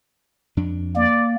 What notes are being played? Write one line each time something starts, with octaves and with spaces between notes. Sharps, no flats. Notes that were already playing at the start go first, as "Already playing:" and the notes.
F2 D4
A#3 D5